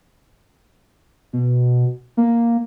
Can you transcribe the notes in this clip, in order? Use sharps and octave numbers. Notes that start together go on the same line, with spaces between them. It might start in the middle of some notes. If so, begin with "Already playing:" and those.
B2
A#3